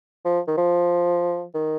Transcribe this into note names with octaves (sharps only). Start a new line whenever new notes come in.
F3
D#3
F3
D#3